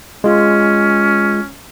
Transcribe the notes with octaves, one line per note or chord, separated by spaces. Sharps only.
G#3 C#4 F4